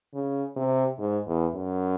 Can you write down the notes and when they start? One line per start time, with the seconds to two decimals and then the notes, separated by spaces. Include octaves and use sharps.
0.14 C#3
0.57 C3
0.99 G#2
1.26 E2
1.55 F#2